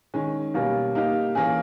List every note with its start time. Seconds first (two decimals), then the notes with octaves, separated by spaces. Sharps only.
0.14 D#3 G#3 C#4
0.54 B2 G3 A#3 C#4
0.95 A#3 D#4 G4
1.35 E3 A#3 C#4 G#4